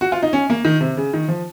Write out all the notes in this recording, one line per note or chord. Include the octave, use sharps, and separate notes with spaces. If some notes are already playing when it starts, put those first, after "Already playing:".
F#4
F4
D#4
C#4
A#3
D#3
C3
C#3
D#3
F3